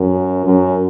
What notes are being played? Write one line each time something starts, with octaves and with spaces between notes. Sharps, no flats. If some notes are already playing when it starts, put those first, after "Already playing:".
Already playing: F#2
F#2